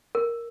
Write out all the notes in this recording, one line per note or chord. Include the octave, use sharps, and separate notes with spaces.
A#4